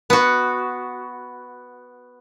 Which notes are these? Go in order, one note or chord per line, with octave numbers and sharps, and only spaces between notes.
B3 F#4